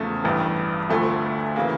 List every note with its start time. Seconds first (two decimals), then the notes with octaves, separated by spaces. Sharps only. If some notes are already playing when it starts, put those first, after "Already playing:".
Already playing: E2 C#3 F3 A3
0.24 A1 G2 E3
0.89 D2 D3 F3 A3
1.56 C#3 E3 A#3